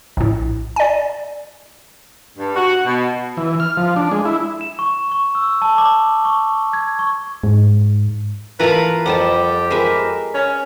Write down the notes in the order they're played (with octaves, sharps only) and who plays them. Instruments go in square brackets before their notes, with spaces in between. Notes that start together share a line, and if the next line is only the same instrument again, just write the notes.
[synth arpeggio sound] A#1 A2
D5 G#5
[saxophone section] G2
F#4
B2
[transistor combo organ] E3
F6
F3
D4
G#3
E4
[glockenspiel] E7
C#6
C#6
E6
A5
D6
C#6
G#6
C#6
[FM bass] G#2
[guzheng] E3 A3 A#3 [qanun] F4 A#4 A#5 [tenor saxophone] B4
[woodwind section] F2 [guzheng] G3 D#5 [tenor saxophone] G4 [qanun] F#5 A5
[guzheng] G#3 B5 [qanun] A#4 B4 E5
[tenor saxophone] C#4